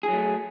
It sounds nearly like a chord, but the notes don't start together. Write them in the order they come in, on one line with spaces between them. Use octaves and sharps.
G#4 F#3 A3